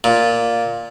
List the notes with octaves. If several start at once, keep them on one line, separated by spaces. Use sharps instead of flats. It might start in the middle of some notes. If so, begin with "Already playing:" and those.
A#2